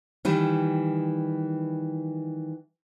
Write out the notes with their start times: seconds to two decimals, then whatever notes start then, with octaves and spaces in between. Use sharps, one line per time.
0.25 D#3 E3 G3